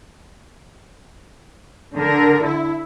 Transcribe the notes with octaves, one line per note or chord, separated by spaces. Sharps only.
D3 A#4
E4